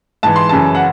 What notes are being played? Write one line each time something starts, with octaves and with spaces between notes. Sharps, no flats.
G#2 E3 A5
C6
F#2 C#3 E3 A5
F#5